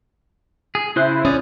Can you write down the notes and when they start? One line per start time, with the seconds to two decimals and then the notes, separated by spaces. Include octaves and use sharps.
0.75 G#4
0.96 C#3 E4 C5 F#6
1.25 C#4 G#4 D5 D#6